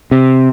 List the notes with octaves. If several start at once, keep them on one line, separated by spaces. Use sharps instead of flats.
C3